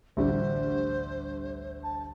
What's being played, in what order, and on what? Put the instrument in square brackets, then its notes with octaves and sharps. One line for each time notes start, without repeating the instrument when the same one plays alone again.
[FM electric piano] A1 D2 [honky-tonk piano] D3 G3 A3 [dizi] C5
[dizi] A5